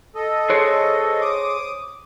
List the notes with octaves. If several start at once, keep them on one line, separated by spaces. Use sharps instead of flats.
A4 D#5
G#4 C5 C#5
D6 D#6